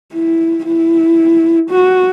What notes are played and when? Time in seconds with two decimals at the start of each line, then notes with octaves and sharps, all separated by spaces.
0.13 E4
0.66 E4
1.70 F#4